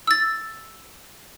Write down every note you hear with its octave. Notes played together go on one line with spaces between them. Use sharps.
E6 A6